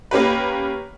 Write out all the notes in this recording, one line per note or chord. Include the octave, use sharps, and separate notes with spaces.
A#3 C#4 G4 B4